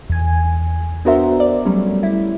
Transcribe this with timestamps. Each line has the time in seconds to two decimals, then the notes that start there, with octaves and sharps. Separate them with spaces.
0.10 E2 G#5
1.05 B3 D4 F#4 A#4 C5 E5
1.40 D5
1.66 F#3 G3 A3 C#4
2.03 E4